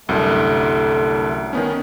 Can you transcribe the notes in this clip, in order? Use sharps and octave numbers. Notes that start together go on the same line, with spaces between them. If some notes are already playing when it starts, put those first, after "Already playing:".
C2 F#2 D3 A3
D#3 B3 C#4